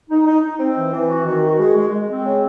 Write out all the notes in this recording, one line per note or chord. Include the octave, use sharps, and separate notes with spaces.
D#4
D#4
D#4
C4
E3
E3
F#4
D#3
F#4
G#3
G#3
G#3
C4
C#3